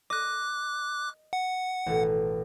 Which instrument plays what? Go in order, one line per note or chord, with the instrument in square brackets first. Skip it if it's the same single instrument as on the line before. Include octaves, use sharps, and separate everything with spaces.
[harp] D#5 [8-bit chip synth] D6 F#6
[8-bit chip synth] F#5
[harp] A1 B2